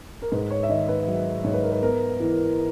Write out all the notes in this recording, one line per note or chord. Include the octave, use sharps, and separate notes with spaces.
A#4
G#2 B4
C#5
E5
D#3 D#5
B4
F#3
G#2 C#5
B4
A#4
B4
B3 A#4
E3